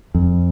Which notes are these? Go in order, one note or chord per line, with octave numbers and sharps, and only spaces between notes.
F2